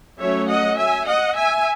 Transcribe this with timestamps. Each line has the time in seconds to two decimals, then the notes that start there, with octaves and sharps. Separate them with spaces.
0.20 F#3 A3 C#4 C#5 E5
0.50 D#5 F#5
0.80 E5 G#5
1.09 D#5 F#5
1.38 E5 G#5